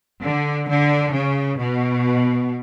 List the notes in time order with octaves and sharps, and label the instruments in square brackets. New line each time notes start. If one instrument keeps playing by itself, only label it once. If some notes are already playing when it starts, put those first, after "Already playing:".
[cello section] D3
D3
C#3
B2